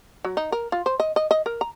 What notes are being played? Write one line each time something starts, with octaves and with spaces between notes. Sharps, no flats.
F#3
D#4
A#4
F4
C5
D#5
D#5
D#5
A#4
A#5